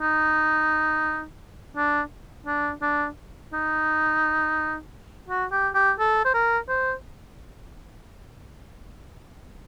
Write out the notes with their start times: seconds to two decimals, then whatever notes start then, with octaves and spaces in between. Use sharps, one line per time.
0.01 D#4
1.77 D4
2.47 D4
2.82 D4
3.53 D#4
5.29 F#4
5.52 G4
5.75 G4
5.99 A4
6.25 C5
6.34 A#4
6.69 C5